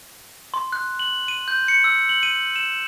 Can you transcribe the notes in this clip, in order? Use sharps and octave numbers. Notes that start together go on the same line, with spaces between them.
C6
F#6
F#7
D#7
G6
C#7
E6
F#7
D#7
E7